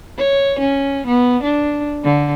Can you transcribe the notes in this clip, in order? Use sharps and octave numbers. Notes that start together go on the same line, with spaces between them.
C#5
C#4
B3
D4
D3